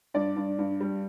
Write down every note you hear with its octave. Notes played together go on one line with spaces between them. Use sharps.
G2 D5
G2
G2
G3